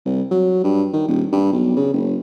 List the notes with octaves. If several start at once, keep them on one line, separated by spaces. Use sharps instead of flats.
C2
F#3
G2
D#3
D#1
G2
B1
C#3
F#1